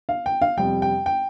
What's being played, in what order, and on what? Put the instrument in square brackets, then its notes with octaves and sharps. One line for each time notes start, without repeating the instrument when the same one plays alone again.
[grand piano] F5
G5
F5
F2 C3 G3 G5
G5
G5